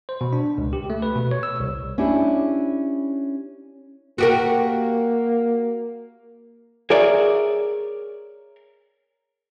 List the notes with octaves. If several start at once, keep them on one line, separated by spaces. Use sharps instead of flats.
C5
B2
D4
C#2
G4
A3
B4
B2
C#5
E6
C2
C#4 D4 E4 G4
A#3 F#4 G4 A#4
G#4 A#4 C#5 D5 E5